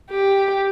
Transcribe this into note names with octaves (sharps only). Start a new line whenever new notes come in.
G4